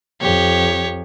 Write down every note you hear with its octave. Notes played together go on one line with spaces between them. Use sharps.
F2 G4 C#5